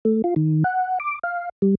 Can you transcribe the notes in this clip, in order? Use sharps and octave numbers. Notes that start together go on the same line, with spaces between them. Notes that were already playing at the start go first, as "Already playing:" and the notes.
A3
F4
D#3
F#5
D6
F5
G3